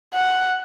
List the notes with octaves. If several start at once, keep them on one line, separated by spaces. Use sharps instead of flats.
F#5